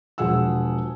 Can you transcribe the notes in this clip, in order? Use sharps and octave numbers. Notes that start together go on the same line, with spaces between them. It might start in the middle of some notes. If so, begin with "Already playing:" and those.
E1 F3 G#4 F#5 E6